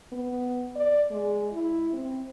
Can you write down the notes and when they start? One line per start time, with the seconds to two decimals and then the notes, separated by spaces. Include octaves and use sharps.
0.12 B3
0.76 D5
1.11 G#3
1.53 E4
1.93 C4